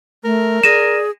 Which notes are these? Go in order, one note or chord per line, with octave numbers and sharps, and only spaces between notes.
A3 A#4
G#4 D5 A#6 D#7 E7